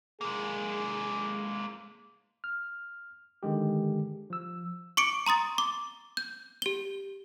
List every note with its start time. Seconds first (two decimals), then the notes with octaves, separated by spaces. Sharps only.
0.21 G#3 A#3 G#4
2.44 F6
3.43 D3 D#3 G#3 G4
4.30 F3 E6
4.97 C#6 D6 C#7 D7
5.26 A#5 C6 D#6 A6
5.58 D6
6.17 G6
6.62 G4 G7